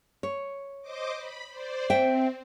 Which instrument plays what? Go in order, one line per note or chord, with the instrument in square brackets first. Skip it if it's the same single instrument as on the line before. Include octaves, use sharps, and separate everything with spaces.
[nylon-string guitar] C#5
[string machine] C5 D#5 D6
B5
C5 D5
[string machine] C4 [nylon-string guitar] C5 E5 G5